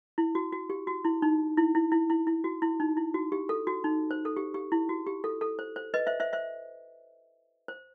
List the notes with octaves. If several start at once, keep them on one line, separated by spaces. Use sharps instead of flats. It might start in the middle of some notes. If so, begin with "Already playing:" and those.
E4
F#4
F#4
G4
F#4
E4
D#4
E4
E4
E4
E4
E4
F#4
E4
D#4
E4
F#4
G4
A4
F#4
D#4
C5
A4
G4
G4
E4
F#4
G4
A4
A4
C5
C5
B4 D#5
C5 E5
C5 E5
C5 E5
C5